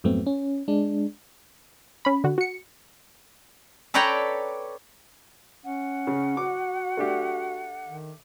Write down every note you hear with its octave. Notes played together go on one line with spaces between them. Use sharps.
F2 G#2 F#3 A3 B3 C4
C#4
G#3 D4
C#4 B5
D3 F#4
F#4 C#7
A4 B4 C#5 D5 G5 A#5
C#4 F#5
C#3
F#4 D6
A3 D4 G4
D#3